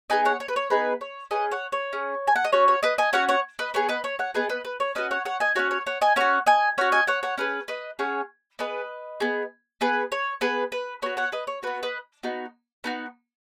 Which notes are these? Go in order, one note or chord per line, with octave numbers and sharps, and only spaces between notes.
B3 D#4 G#4 D#5 G#5
C#5 F#5
C#5
B4
C#5
B3 D#4 G#4 B4
C#5
C#4 G#4 B4 D#5
C#5 F#5
C#5
C#4 G#4
G#5
F#5
D#5
C#4 F#4 C#5
C#5
B4 D#5
D#5 G#5
C#4 F#4 C#5 F#5
C#5 F#5
B4 D#5
B3 G#4 C#5
B4 D#5
C#5
C#5 F#5
B3 G#4 B4 D#5
B4 D#5
B4
C#5
C#4 F#4 B4 D#5
C#5 F#5
C#5 F#5
D#5 G#5
C#4 F#4 C#5 F#5
C#5
C#5 F#5
D#5 G#5
C#4 F#4 C#5 F#5
D#5 G#5
C#4 F#4 C#5 F#5
D#5 G#5
C#5 F#5
C#5 F#5
C#4 G#4 B4
B4 D#5
C#4 G#4 C#5 F#5
B3 G#4 B4 D#5
B3 G#4
B3 G#4 B4
C#5
B3 G#4 B4
B4
B3 F#4 C#5
C#5 F#5
B4 D#5
C#5
B3 F#4 B4
B4 D#5
B3 D#4 F#4
B3 D#4 F#4